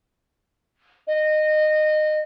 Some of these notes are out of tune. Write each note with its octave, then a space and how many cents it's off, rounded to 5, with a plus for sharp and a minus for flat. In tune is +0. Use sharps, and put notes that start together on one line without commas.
D#5 -20